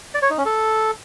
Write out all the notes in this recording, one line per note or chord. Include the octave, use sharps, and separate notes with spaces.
D5
C#5
D#4
C#4
A4